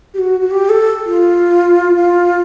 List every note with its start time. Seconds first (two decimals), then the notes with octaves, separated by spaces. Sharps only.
0.14 G4
0.19 F#4
0.41 F#4
0.51 G4
0.69 A4
1.06 F4
1.96 F4